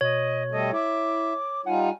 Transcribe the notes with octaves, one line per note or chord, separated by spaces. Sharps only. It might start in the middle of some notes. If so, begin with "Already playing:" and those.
B2 C#5 D#5
G3 A3 A4 D#5
E4 E5 D6
G3 D#4 F4 F#5 G#5
G#5